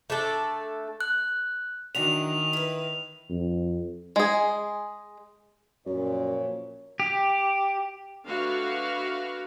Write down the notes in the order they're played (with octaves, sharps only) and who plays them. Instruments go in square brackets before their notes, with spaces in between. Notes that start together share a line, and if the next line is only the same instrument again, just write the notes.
[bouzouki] A3 D4 A4
[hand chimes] F#6
[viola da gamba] D#3 [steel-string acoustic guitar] E3 F#3 D4 [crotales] F7
[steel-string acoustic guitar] E4 B4
[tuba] F2
[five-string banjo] G#3 G#4
[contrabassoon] F#2 [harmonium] A#2 [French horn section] F3 A#4 C#5
[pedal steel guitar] G4
[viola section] D3 A3 F#4 B4 F5 B5